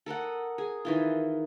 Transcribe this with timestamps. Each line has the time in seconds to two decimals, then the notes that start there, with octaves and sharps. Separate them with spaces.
0.06 A4 A#4 D#5 F#5
0.58 G#4
0.85 D#3 E3 F4